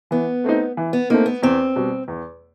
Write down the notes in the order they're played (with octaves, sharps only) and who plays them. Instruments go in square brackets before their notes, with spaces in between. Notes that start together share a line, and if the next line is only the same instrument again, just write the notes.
[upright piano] E3 [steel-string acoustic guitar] B3
[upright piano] A3 C4 D#4
E3
[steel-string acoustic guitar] B3
[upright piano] A3 C4 D#4 [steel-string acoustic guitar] A#3
[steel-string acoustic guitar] B3
[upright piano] E2 [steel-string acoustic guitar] C4
[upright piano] B2 G3
E2